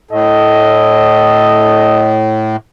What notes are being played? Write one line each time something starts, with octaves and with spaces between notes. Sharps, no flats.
A2 A4 D#5